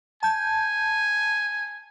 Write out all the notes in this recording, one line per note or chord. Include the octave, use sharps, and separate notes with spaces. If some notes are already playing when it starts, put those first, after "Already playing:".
G#5 A5 G6